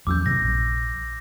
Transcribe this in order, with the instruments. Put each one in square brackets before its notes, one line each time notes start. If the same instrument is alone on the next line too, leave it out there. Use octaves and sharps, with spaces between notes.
[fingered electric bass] E2 F#3 C#4 [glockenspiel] D6 E6 G6
[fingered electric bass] G2 C3 D#3 [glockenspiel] A#6
[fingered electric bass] A#1